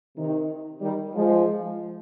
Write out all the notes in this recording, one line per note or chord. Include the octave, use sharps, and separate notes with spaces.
C3 D#3
D#3 G3
F3 G#3